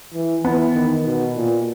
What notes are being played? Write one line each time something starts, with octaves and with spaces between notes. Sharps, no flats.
E3
E3 B3
D#3
B2
A#2